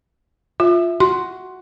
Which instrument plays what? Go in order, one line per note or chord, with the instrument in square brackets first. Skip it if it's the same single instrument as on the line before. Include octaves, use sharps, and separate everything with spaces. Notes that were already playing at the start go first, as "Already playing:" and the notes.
[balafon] F4 [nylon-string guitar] E5
[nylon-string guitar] F#4 [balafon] C6